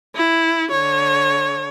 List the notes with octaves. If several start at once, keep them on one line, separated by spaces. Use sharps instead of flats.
E4
D3 C#5